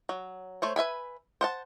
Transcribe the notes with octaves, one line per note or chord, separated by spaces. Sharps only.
F#3
A3 C5 C#5
B4 E5 G#5 B5
C5 F#5 A5